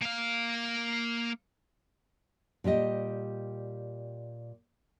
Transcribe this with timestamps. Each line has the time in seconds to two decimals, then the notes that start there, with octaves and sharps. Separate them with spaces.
0.02 A#3 F5
2.64 A#2 G3 G4 D#5